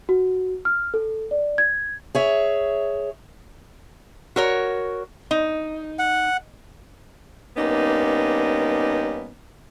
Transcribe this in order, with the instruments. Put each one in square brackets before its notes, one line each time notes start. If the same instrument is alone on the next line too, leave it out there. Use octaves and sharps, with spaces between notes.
[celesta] F#4
F6
A4
D5
G#6
[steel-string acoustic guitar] G#4 C#5 E5
[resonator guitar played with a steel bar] F#4 A#4 C#5
D#4
[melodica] F#5
[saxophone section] G2 A#3 B3 C#4 D#4